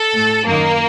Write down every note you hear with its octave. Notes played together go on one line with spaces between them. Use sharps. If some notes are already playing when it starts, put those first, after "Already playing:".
Already playing: A4
A2
F#2 D#3 A#3